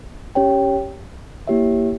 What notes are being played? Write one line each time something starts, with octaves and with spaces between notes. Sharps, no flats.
C#4 G4 C#5 G5
A#3 E4 G4 C#5 E5